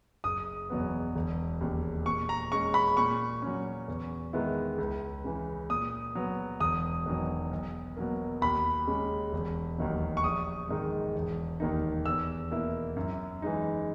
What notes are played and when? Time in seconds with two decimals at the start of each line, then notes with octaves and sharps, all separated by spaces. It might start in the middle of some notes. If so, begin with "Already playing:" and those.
0.24 F#1 D#6
0.70 E2 B2 F#3 B3
1.15 E1
1.61 D#2 C#3
2.06 A#2 C#6
2.29 A#5
2.52 G#3 C#4 C#6
2.74 B5
2.97 A#2 C#6
3.42 F#3 C#4
3.88 E2
4.33 D#3 G#3 B3 E4
4.78 C#2
5.24 C#3 E3
5.69 A#2 D#6
6.15 F#3 B3
6.60 E1 D#6
7.06 E2 D#3 F#3
7.51 B1
7.97 B2 F#3 A#3
8.41 D#2 B5
8.87 C#3 G#3 C#4
9.33 E1
9.78 D#2 D#3 F#3
10.17 C#6
10.24 A#1 D#6
10.69 G#2 D#3 G#3
11.15 E1
11.60 D#2 D#3 A#3 D#4
12.06 E2 E6
12.51 B2 A#3 E4
12.96 F#2
13.42 E3 G#3 D#4